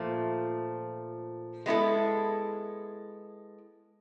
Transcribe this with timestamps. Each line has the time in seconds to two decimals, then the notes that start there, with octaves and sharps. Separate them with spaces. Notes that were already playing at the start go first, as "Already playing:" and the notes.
Already playing: A#2 F3 A3
1.66 G#3 B3 E4 A4